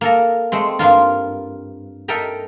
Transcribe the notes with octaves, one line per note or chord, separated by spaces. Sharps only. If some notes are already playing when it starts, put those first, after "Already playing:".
A#3 A4 A#5
G#3 A3 C4
G2 A#3 F4
A4 A#4 D#5 E5 G5 A#5